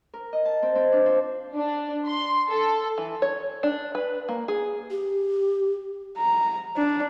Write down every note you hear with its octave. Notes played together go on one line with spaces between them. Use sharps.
A#4
D#5
A5
C4
C4
D4
F3
D4
C6
A4
E3
C#5
D4
B4
A#3
G#4
G4
A#5
D4